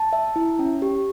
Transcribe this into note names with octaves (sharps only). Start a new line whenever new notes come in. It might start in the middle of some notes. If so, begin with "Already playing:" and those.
Already playing: A5
E5
E4
C#4
G4